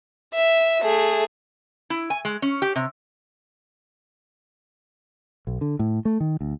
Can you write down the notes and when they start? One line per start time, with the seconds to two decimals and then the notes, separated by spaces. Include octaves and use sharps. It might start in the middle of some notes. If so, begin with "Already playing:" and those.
0.34 E5
0.82 A3 G#4
1.90 E4
2.10 G#5
2.25 G#3
2.42 C#4
2.62 G4
2.76 C3
5.47 B1
5.61 D3
5.79 A2
6.05 A3
6.20 D#3
6.41 D2